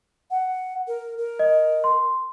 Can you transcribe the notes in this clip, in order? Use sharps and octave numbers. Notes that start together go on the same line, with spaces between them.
F#5
A#4
A#4
D#5
C6